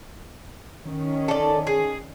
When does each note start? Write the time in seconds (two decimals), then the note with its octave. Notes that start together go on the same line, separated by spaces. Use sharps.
0.84 D#3 C#4
1.28 A4 D5
1.67 G#4